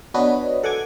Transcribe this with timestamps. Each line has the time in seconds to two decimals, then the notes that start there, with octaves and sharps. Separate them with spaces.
0.14 B3 D4 F#4 B4 C#5 D#5
0.64 A4 F#5 G#5 D6 G#6